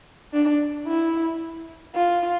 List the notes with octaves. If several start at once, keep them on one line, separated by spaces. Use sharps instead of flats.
D4
E4
F4